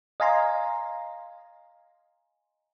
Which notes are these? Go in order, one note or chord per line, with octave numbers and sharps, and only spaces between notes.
D#5 F5 G#5 A#5 C6